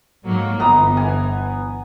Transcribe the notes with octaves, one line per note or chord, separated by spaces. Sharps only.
G#2 F#3 A#3
G1 E3 B3 A#5 D#6
G#5